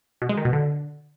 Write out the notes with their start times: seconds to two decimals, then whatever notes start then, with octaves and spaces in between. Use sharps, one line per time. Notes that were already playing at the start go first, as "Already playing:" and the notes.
0.22 B2
0.29 G#3
0.37 D#3
0.45 B2
0.53 D3